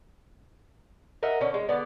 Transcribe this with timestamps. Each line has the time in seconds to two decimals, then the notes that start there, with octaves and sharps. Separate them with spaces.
1.23 A#4 D#5 E5 F#5
1.41 D3 C#4
1.54 G#3
1.69 D3 B3 D5